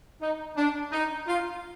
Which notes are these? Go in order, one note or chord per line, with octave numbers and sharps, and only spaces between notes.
D#4
D4
D#4
F4